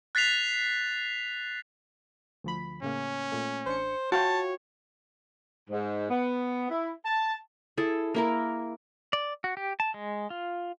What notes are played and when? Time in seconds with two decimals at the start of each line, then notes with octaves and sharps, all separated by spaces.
0.15 F#6 A6 B6 C7 F7
2.44 D2 F3 B5
2.82 A2 C#3 A#3 C#4
3.32 A#2 A3
3.67 A1 D4 C5 C#7
4.12 F4 F#4 C#5 F5 G5 A5
5.70 G#2
6.10 B3
6.69 E4
7.04 A5
7.78 E4 G#4 A4
8.14 A#3 E4 A#4
9.13 D5
9.44 F#4
9.57 G4
9.80 A5
9.94 G#3
10.30 F4